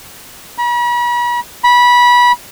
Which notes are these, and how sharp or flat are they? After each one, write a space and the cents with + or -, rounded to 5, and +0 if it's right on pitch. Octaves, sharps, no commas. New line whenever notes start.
B5 -45
B5 -20